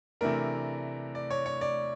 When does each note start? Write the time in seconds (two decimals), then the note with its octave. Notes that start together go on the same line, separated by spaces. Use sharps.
0.21 C3 E3 A3 D4 A#4
1.15 D5
1.30 C#5
1.46 C#5
1.61 D5